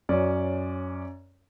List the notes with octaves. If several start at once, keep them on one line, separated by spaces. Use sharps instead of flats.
F#2 C#4 D5